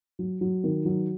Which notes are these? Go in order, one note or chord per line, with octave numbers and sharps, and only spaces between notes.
F#3
F#3
D#3
F#3